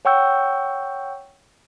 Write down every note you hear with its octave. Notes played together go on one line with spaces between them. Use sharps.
C#5 F#5 G5 C#6 E6 G6